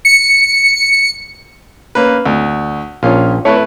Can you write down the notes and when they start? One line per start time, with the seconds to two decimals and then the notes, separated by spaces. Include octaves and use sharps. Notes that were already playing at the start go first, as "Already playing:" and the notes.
0.05 C#7
1.95 A#3 C#4 B4
2.26 D2
3.03 A#1 C#4 F4
3.45 A3 E4 B4 C#5